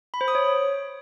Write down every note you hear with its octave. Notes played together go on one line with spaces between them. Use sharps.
B5
C5
D#6
C#5